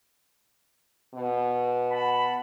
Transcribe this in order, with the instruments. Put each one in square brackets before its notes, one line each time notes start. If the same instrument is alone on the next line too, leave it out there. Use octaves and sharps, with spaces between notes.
[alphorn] B2
[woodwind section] F#5 A5 B5